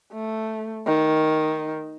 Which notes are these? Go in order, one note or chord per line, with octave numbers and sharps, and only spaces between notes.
A3
D#3